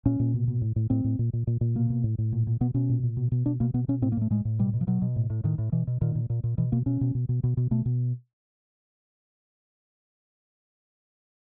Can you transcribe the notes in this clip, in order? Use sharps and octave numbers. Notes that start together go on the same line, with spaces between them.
A#2 C#4
A#2
B2
B2
A2
A2
A2 C4
A2
A#2
A#2
A#2
A#2
B2 A#3
B2
A2
A2
A#2
A#2
B2 B3
B2 C#4
A#2
A#2
B2
B2
B2 D4
B2 A#3
B2 B3
B2 C#4
A2 C4
A#3
A2 A3
A2 G#3
A2
B2 G3
B2
F3
B2 F#3
B2
A2
A2
A2 D#3
A2
B2 E3
B2
A#2 D#3
A#2
A#2
A#2
B2 E3
B2 A#3
B2 C#4
B2
B2
B2
B2
B2
B2 A3
B2